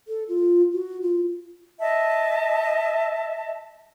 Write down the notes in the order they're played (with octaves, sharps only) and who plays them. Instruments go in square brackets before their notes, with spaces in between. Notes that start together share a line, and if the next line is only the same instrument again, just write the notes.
[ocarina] A4
F4
F#4
F4
[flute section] D#5 E5 A5